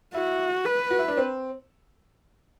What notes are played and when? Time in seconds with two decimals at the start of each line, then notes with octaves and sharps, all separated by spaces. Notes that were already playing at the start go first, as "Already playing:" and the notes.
0.14 E4 F#4
0.66 B4
0.90 F#4
0.99 E4
1.08 D4
1.17 C4